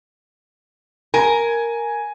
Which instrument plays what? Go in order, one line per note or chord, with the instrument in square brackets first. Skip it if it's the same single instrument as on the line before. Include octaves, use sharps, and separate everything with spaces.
[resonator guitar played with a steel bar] A#4 [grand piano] G#5